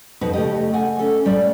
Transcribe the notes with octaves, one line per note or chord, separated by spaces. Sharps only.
F2 B2 D#4 F#4 B4
C#3 A3 G4 D#5
A4 F#5 G#5
C#4 A4
A2 G3 C#5 D5